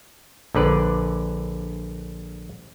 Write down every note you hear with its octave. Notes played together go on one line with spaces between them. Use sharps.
A#1 D3 B4 D5